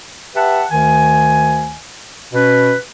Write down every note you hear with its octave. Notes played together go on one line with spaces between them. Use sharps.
G4 B4 E5 F#5 A5
D2 D#3 G#5
B2 C#4 B4